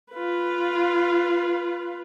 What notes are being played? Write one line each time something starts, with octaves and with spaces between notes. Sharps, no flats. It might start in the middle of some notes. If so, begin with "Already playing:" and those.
F4 B4